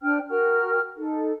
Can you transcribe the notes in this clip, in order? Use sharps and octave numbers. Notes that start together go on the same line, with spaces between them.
D4 C5 G5 F6
F#4 A#4 G5 F6
D#4 A4